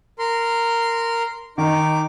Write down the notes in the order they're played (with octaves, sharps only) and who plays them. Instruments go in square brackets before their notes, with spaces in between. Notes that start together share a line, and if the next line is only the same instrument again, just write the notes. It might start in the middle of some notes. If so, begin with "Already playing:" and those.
[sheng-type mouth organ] A#4 C6
[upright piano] D#3 [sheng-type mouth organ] D#4 D6